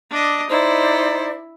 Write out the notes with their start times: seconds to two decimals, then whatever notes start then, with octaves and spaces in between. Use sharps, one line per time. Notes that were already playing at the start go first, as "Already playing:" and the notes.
0.10 D4 D#5
0.50 D#4 E4 C5 D5